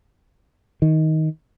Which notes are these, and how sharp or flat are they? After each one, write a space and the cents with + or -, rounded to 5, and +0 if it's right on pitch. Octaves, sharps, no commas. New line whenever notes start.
D#3 +15